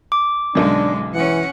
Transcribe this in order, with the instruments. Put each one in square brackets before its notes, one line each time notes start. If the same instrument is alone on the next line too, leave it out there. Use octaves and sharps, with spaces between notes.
[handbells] D6
[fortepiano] B1 F#2 [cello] D3 G#3 [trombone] D4
[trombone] E3 [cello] C#4 F#5